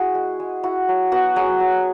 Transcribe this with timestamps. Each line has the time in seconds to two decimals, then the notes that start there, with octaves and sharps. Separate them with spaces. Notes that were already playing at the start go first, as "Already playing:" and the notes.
Already playing: E4 F#4 G#4
0.15 G#3
0.40 G#3
0.63 E4 F#4
0.88 F#3
1.12 B3 F#4 F#5
1.36 F#3 G#4 G#5
1.60 F#3